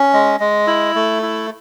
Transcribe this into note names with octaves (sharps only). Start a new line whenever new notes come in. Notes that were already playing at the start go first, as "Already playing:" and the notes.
Already playing: C#4
G#3
G#3
E4
A3
E4